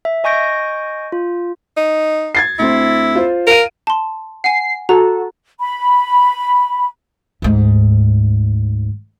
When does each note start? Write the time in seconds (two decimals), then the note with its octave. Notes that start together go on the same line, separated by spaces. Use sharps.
0.05 E5
0.24 D#5 G#5 C#6 G6 A#6 D7
1.12 F4
1.77 D#4
2.35 G#6 A6 C7
2.59 D2 C4 E4
3.15 F4 C5
3.47 A#4 F5 D7 D#7
3.87 A5 C6
4.44 F#5 G#5 C7
4.89 F#4 A4 A#5
5.60 B5
7.42 D2 G#2